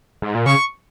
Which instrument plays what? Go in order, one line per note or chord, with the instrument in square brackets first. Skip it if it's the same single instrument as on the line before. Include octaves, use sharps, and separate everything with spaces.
[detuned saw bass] G#2
A#2
[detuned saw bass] C#3 [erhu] C#6